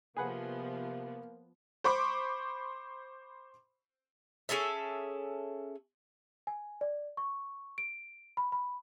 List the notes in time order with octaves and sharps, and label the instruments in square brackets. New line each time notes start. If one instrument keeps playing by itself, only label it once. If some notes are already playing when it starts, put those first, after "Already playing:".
[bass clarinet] C3 [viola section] F3 B3 [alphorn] A#3 [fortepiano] G#4 B4 F#5
[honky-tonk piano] C5 B5 C#6 D6
[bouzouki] C#4 G#4 A4 E5
[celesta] G#5
D5
C#6
D7
B5
B5